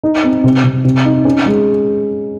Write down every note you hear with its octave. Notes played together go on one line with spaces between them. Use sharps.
D#4
C4
C3
C3
C3
D#4
C#4
G#3